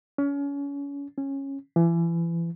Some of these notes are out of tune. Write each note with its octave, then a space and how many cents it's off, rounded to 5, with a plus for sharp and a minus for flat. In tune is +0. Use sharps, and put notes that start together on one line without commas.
C#4 +30
C#4 -15
E3 +30